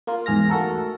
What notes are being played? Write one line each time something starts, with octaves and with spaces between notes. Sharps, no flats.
A#3 F4
E2 G#2 G#4 F6 A#6
A3 F#4 A4 A#4